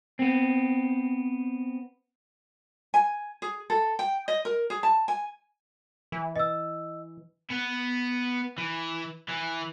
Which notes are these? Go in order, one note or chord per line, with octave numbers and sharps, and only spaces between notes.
B3 C4
G#5
G#4
A4
G5
D#5
A#4
G#4
A5
G#5
E3
D#5 E6
B3
E3
E3